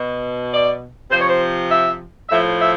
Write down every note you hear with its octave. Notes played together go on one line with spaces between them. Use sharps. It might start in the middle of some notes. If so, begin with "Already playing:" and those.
Already playing: B2
D5
C3 F3 C5
C#5
C5
E5
A2 F3 E5
E5